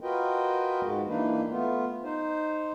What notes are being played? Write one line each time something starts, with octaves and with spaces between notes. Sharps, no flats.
F4 F#4 A#4 B4 D#5 G5
G#2 G#3 F#4
E3 A#3 D4 D#4 B4
A3 B3 F4
D#4 C5